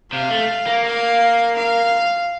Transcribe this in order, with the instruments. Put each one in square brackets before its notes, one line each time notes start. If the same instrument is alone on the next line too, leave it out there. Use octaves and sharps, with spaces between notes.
[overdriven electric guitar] C3 [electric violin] F5
[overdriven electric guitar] A3
A#3
[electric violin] F5
F5